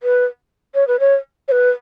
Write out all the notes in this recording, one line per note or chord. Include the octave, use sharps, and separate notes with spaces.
B4
C#5
B4
C#5
C#5
B4